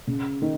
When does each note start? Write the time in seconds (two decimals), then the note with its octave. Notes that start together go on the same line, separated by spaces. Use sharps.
0.07 C#3
0.42 D#3